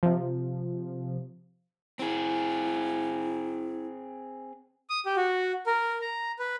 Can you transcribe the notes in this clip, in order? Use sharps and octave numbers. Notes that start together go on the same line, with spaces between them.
C3 F3
C4 E4 G#4
D#6
G4
F#4
A#4
A#5
B4